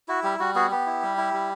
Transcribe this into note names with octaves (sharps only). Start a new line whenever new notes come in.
E4 F#4
G3 G4
G3 F#4
B3 F#4 G#4
B3 G4
E4
G3
E4
G3